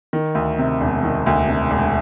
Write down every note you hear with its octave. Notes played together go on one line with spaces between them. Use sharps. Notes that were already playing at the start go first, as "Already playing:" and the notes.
D#3
D2
C3
E1
D#3
D2
C3
E1